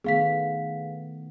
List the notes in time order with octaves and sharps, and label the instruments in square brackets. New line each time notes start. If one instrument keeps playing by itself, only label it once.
[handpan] D#3 A3 B3 [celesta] G#4 F5 B6